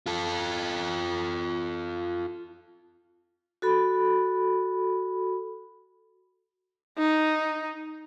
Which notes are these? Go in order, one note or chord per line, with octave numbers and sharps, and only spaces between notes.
F4 A4
F#4 A4 B5
D#4